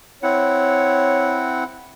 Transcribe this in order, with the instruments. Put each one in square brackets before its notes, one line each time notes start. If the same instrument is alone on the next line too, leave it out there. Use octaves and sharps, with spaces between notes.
[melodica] C4 E4 F#5 [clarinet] C#5